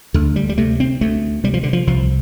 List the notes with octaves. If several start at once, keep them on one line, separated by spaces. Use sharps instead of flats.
D2 D3
G3
G3
C3 A3
C4
D2 A3
C3 G3
F3
D3
F3
C2 F3